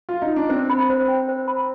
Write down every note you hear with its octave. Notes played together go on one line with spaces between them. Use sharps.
F4
D#4
D4
C4 C5
B5
C5
G5
C5
B5